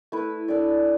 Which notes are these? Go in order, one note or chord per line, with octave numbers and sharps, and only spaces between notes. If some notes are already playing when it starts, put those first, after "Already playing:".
A3 E4 B4
D4 A4 D5